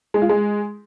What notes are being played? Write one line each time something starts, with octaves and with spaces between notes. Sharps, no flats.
G#3
F4
G#3